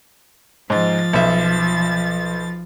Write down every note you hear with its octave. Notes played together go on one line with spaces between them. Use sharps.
G#2 F3 A6
B1 E5